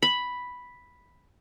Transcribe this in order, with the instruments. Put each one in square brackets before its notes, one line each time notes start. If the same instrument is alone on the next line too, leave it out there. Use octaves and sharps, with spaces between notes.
[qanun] B5